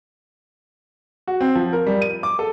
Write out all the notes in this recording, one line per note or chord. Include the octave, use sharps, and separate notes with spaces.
F#4
C4
F3
A#4
G3
D#7
D6
A4